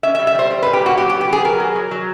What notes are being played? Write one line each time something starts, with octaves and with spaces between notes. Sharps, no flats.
C#4 E5
E5
G3
E5
G3 C5
G3
B4
A#2
G4
A#3 F#4
F#3 G4
G4
B3
G4
B3 G#4
F#3 A#4
F#3
F#3
F#3